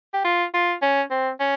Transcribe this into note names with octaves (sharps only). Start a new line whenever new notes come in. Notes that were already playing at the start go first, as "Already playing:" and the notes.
G4
F4
F4
C#4
C4
C#4